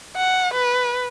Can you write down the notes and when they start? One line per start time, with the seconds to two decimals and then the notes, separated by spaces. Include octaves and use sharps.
0.16 F#5
0.53 B4